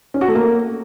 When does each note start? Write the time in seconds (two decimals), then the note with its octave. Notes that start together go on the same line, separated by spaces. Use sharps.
0.14 C#4
0.21 F#4
0.28 A3
0.35 A#3